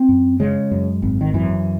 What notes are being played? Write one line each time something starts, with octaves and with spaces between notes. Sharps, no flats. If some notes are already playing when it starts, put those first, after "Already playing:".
Already playing: C4
F#2
C#3 G#3
F#2
G#1
D#3
F#2 E3